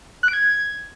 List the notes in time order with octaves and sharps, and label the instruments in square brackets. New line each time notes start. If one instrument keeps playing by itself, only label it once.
[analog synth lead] F#6
D7
G#6